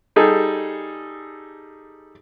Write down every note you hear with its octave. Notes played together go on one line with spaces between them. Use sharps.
G3 D#4 G#4 A4